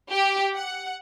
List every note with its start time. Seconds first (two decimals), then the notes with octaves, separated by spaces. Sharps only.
0.11 G4
0.55 F#5